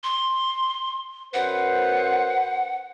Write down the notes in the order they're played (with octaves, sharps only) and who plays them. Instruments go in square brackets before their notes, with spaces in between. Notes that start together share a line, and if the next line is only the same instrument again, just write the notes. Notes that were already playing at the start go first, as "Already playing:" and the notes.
[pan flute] C6
[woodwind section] F#2 B4 C5 [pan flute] F#5